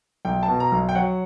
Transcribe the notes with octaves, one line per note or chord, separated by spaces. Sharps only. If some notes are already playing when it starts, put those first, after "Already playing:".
B1 G5
A5
B2
A#5
B1
G5
F#3 F#5